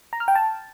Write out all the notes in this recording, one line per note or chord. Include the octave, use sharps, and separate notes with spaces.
A#5
F6
G5
A5